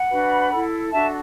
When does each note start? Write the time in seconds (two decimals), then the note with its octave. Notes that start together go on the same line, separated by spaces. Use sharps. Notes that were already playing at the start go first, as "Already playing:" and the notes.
Already playing: F#5 B5
0.10 D4 F#4 B4
0.51 E4 A4
0.91 D4 F#4 A4 E5 A5